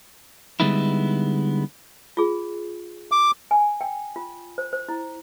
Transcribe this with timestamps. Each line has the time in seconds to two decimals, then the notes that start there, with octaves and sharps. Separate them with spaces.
0.60 D3 G3 G#3 B3 D#4 E4
2.17 F4 G#4
3.12 D6
3.51 G#5
3.81 G5
4.16 F4
4.58 C5
4.73 C5
4.89 E4